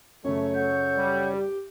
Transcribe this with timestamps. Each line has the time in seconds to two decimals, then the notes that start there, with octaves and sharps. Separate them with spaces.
0.24 F#2 C#3 A3 C#5
0.55 A4 F#5 G6
0.97 G3
1.34 G4